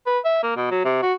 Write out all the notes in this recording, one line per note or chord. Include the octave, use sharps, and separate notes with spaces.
B4
E5
A#3
B2
F#3
C3
F#4